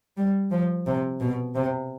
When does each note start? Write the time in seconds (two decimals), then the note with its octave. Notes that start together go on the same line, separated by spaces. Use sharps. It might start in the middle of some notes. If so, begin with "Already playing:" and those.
0.17 G3
0.51 F3
0.87 C3
1.21 B2
1.55 C3